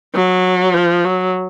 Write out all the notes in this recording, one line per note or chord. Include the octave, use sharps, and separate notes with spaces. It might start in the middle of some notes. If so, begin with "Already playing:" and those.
F#3
F3
F#3